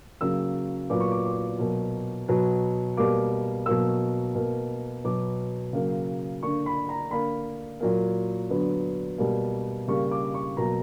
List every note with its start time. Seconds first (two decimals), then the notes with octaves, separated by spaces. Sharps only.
0.21 C#3 F#3 A#3 E6
0.90 A#2 F#3 B3 D6
1.00 C#6
1.11 D6
1.25 D6
1.59 B2 F#3 A#3
2.28 B2 F#3 B3
2.97 B2 G3 A#3 D6
3.66 B2 F#3 A#3 E6
4.35 B2 A#3
5.04 B2 F#3 B3 D6
5.73 C#3 F#3 A#3
6.43 D3 A#3 C#6
6.66 B5
6.89 A#5
7.11 D3 A#3 B5
7.80 A#2 F#3 A#3
8.50 D3 F#3 B3
9.18 B2 G3 A#3
9.88 C#3 G3 A#3 C#6
10.11 D6
10.34 C#6
10.57 B2 F#3 A#3 A#5